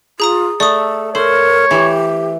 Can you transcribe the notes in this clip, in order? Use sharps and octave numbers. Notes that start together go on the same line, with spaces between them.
F4 G#4 A#5 D#6
A3 A4 D5 D#6
A4 A#4 C5 C#5
E3 G4